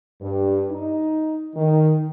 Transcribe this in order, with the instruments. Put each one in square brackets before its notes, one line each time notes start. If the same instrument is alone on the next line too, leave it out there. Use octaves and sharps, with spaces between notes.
[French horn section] G2
D#4
D#3